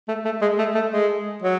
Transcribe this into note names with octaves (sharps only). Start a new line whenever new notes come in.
A3
A3
G#3
A3
A3
G#3
F#3